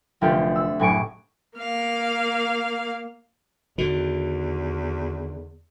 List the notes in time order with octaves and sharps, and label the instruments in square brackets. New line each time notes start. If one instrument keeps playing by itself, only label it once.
[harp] F1 D2 C4 F4 G4 G6
C7
E6
F#1 A2 G#5 C#6 D6 D7
[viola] A#3 F5
[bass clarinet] E2 [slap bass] D3 D#3 [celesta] F#4